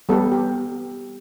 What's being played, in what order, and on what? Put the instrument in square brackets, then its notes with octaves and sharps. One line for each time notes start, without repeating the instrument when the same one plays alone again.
[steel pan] G3 B3 G4 A4
G4